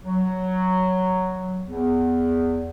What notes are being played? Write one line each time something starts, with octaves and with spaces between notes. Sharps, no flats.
F#3
E2